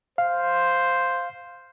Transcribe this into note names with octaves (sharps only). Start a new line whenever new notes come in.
C5 F5